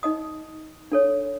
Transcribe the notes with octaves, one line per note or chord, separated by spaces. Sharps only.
D#4 D#5 D#6
D4 A4 C#5